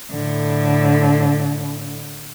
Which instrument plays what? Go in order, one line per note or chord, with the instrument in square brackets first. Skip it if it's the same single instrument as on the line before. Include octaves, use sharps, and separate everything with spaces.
[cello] A2 D3